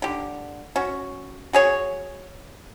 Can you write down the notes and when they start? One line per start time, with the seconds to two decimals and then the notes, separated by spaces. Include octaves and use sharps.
0.02 D3 G4
0.76 C#4 F#4
1.53 F#4 G#4 C#5